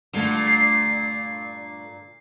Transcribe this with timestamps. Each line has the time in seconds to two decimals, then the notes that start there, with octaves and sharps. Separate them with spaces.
0.13 G2 A#2 D3 A3 F4 F#5
0.47 C7